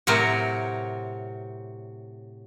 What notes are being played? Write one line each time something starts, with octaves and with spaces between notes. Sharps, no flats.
A2 C3 F#3 C4 A#4